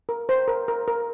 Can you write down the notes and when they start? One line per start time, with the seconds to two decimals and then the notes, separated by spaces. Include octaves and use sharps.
0.09 A#4
0.29 C5
0.48 A#4
0.68 A#4
0.88 A#4